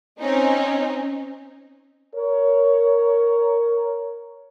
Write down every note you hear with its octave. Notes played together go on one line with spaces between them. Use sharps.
C4 C#4 D#4
A#4 C#5